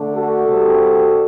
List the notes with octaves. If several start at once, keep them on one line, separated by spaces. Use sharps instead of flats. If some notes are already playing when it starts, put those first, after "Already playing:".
Already playing: D3 A3
F#4 A4
C3 G3